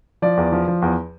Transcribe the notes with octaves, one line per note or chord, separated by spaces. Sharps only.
F3 D5
E2
F3
F3
E2